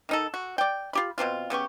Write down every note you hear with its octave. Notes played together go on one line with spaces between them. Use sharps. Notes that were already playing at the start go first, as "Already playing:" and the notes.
D#3 D#4 A4
F#4
D5 G5
F4 G4 B5
B2 F3 C4 F4
C#3 B3 G4 C#6